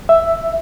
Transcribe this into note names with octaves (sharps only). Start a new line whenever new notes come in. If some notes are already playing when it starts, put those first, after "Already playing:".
E5